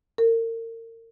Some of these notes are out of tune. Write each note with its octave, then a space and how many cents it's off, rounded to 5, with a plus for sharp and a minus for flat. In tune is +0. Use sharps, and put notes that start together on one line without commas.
A#4 -35